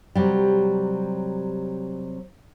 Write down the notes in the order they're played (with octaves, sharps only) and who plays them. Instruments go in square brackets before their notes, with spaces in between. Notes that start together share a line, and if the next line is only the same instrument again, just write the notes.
[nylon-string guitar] C3 F#3 G3